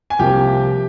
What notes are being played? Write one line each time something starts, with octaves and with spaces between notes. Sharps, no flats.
G#5
C2 C3 F3 A#3 G4 G5